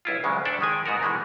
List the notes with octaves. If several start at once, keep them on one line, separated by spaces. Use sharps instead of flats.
B1 E4 F4
D2 C#3 F#3 G#3
D4 A4 D5 E5 F#5 G5
D#3 G#3 G#5
G#2 B3 F#4 A#4
B2 E3 G#3 A3